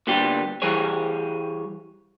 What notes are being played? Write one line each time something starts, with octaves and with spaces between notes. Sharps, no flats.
A#2 D3 G3 B3 G4
E3 G3 G4 G#4 C#5